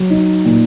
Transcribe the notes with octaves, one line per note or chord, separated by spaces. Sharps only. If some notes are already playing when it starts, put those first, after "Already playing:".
Already playing: F#3
D#4
A#2